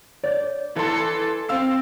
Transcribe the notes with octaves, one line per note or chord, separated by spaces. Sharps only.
D5 G6
E3 A4 C6
C4 F5 E6